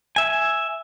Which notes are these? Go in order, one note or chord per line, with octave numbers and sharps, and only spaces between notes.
E5 G#5